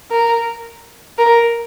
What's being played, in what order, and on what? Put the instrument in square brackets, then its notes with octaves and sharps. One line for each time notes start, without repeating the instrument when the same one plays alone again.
[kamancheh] A#4
A#4